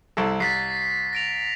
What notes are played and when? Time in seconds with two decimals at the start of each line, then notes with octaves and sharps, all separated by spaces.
0.17 C2 E4 A4
0.40 C2 A6 B6 C7
1.13 A#6 D7 F7